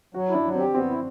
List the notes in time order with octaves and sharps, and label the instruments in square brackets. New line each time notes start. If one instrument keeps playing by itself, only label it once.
[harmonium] F#3 [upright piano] F#4
[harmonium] E4
[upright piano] D4
[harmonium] F#3
[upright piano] C4 [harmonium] G4
[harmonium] B3 [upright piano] C4
[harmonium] E4